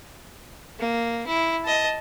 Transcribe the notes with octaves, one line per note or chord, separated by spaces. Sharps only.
A#3
E4
D#5 A5